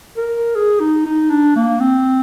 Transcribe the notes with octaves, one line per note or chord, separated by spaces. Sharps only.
A#4
G#4
D#4
D#4
D4
A#3
C4